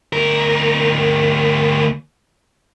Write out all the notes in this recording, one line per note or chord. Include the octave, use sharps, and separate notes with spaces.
D2 A#4